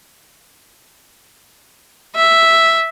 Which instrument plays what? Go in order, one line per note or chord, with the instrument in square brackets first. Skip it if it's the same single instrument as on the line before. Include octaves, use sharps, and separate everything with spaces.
[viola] E5